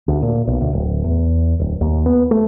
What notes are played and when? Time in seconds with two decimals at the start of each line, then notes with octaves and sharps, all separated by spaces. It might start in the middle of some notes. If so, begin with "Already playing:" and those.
0.08 D2
0.22 A#2
0.47 B1
0.61 D2
0.73 D1
1.04 E2
1.59 D1
1.81 D#2
2.06 B3
2.31 A3